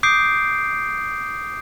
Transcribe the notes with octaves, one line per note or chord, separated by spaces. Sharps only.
D6 D#6 G6 C7 D7